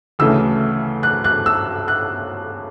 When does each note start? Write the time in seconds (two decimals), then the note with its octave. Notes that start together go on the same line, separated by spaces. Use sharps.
0.19 D2 C#3 E3 A3 E6
1.03 F#6
1.24 F#6
1.46 E6
1.88 F#6